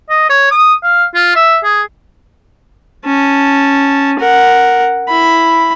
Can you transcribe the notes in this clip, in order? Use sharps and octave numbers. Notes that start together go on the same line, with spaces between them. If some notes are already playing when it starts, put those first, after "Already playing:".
D#5
C#5
D#6
F5
F4
E5
G#4
C#4 A5
A#4 F#5
E4 B5